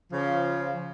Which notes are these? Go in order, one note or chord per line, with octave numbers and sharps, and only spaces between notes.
C#3 F3